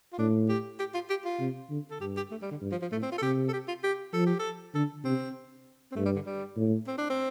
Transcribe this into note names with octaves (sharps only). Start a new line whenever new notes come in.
F4
A2 D4
G4
G4
F4
G4
F4
C3
D3
A4
G2 G4
G4
A3
G3
D3
G2
F3
F3
A2 A3
C4
F4
A4
C3 G4
A4
G4
F4
G4
F3 A4
G4
A4
D3 A4
C3 C4
C4
G2 A3
G3
D3
G3
A2
C4
D4
C4